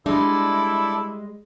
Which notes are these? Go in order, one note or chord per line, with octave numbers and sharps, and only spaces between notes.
G3 G#3 D4 E4 A4 D5 E5